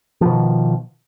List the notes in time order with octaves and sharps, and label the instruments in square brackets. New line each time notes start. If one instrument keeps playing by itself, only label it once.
[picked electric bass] F3
B2
D#3